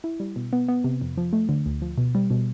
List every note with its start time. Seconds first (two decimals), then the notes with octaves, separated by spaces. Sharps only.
0.04 E4
0.20 G3
0.36 B2
0.53 B3
0.68 B3
0.84 C3
1.01 F2
1.17 F3
1.33 A3
1.49 D3
1.66 D2
1.82 F3
1.98 B2
2.15 G3
2.30 B2